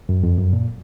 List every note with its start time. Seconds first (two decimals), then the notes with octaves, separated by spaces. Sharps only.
0.09 F#2
0.23 F2
0.39 F#2
0.53 A#2